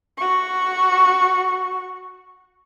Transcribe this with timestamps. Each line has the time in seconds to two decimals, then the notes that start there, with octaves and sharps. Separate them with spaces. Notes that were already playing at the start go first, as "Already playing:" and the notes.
0.17 F#4 C#6